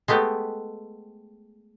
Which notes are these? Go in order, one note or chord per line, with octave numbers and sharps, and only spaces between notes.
G#3 A3 B3 G4